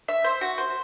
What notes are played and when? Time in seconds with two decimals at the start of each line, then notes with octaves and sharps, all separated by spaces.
0.08 E5
0.24 C5
0.41 F#4
0.58 C5